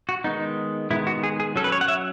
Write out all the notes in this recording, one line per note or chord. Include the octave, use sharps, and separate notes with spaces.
F#4
D#3 G#3 B3 D#4
D#3 G#3 B3 E4
F#4
G#4
G#4
F#3 C#4 A4
B4
C#5
F#5
E5